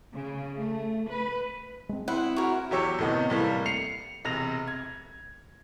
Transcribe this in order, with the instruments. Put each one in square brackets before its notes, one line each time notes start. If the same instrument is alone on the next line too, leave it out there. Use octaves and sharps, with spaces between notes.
[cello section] C#3
A3
B4
[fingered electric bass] G#3 C4
[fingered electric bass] C4 [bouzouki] E4 [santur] C5 D#6 [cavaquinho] F#5
[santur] F#4 G5 D6 [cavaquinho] A#4 C#5
[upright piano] E2 F#3 G4 C#5 E6 C#7
A2 C3 D#3 B3 D#4
A2 C3 E3 G3 A3 A#3
C7 C#7 F7
E1 C3 A#6 F7
G#6